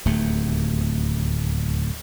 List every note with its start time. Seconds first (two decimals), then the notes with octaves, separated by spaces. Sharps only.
0.05 D1 D#2 A3